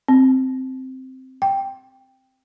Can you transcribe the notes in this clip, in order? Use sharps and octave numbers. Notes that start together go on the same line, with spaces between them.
C4
G5